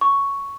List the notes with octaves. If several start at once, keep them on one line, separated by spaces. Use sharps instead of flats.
C#6